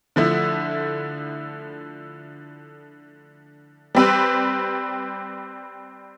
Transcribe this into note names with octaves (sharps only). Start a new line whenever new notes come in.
D3 F3 A3 E4
G3 C4 G4 B4